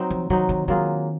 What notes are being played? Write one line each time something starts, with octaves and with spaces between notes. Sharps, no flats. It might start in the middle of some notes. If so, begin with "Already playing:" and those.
Already playing: F#3 C4 D#4
F3
D#3 F#3 C4 D#4
D#3
D#3 F#3 A#3 F4 G#4